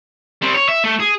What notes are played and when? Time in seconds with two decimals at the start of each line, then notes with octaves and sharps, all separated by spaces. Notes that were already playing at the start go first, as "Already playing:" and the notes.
0.42 G3 C4
0.54 C#5
0.69 E5
0.84 A3
1.00 G#4